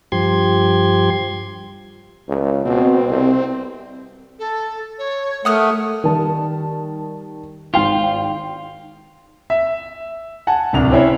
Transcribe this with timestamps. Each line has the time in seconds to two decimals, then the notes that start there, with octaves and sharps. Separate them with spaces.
0.12 G2 F3 G4 C6 G#6
2.28 C#2
2.65 B2 C4
3.08 C2
4.39 A4
4.99 C#5
5.45 A3 A#4 F#5 D#6 F6
6.04 D#3 G3 A5
7.74 G#1 F4 G5 C7
9.50 E5
10.47 F#5 G#5 A5
10.73 D1 C2 D4 F7
10.92 C4 C#4 E4 C5 C#5